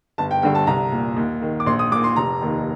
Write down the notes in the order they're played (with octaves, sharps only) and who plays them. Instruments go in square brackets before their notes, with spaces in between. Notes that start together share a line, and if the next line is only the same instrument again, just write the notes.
[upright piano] G1 A5
G5
G2 D3 G5
A5
C2 A#5
A#2
D#2
D#3
D6
A#1 C6
D#6
A#2 D6
C6
F1 A#5
D#2 D#3